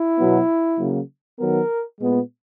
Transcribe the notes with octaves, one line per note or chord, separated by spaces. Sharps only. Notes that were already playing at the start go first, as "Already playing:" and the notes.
Already playing: E4
B2 F#3 B3
C#3 F#3 A#3
D#3 F#3 B3 A#4
A#2 G#3 B3